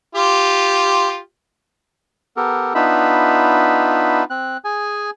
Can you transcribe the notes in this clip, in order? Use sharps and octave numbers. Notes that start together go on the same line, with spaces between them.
F4 G4
B3 G4 A4 A#4
B3 D4 D#4 F4 E5 B5
C4 F#6
G#4 G#5